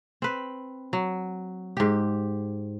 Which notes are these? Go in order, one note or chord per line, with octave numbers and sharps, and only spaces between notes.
C4 B4
F#3
G#2 G4